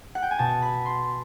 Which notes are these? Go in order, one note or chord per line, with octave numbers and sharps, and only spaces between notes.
F#5
G5
G#5
B2 A5
B5
C6